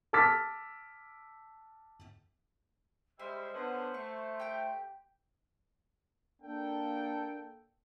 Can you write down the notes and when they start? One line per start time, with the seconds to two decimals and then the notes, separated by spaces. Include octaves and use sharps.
0.13 A5 D6 E6 F6 A6 B6
3.19 G3 G#3 C5 E5 C6
3.54 D3 B3 C#4
3.94 A3 C#6
4.40 G4 G5
6.42 A#3 D4 A4 G5